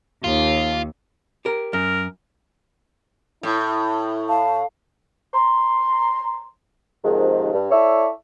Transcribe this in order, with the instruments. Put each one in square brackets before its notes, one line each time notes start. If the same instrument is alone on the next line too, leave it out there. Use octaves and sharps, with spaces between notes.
[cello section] D#2 [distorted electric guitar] F4
[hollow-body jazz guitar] G4 A#4
[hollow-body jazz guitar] F#2 [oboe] A#4
[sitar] A2 [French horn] E4
[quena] F5 [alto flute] A5
[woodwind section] A#5 C6
D#2 G#2 C3 D#3 F3 G#3
G2
E4 A4 C#5 D5 E5